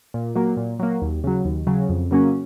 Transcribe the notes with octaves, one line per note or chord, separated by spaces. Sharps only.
A#2
F#3 A#3
A#2
F#3 A#3
D#2
C#3 F#3
D#2
C#3 F#3
F2
C#3 F#3 A#3 C#4